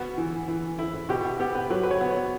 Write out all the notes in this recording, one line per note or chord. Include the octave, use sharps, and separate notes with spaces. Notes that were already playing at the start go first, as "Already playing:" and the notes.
Already playing: B3 F#4
E3
E3
E4
B2 G4
B3 G4
B4
F#3 B4
B4
C#5
B3
C#5